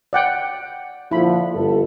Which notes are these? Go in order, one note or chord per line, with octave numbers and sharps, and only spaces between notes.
D5 F#5 G5
A#2 D3 F3 E4 B5
G1 D2 A4